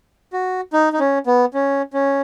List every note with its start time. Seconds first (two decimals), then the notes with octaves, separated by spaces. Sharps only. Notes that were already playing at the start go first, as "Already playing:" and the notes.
0.33 F#4
0.73 D#4
0.93 D#4
1.00 C#4
1.27 B3
1.54 C#4
1.93 C#4